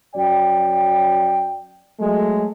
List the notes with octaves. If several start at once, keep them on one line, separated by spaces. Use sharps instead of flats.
F#2 F#3 D5 G5
F#3 G#3 A3